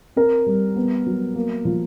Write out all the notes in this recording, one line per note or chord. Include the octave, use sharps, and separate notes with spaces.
C4 A#4
G3
B3
F#3
A#3
F3